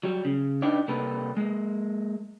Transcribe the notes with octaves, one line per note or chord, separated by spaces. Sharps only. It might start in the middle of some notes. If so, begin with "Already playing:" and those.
F#3 G3
C#3
D4 D#4 G4 B4 D5
C3 G3 A#3 A4 B4
G#3 A#3